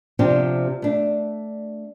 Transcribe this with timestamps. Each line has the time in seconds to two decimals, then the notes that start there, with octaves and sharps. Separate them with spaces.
0.19 C3 F3 D4 G4
0.82 A3 D4